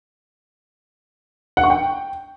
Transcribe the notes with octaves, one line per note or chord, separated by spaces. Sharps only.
F#5
C#6
G5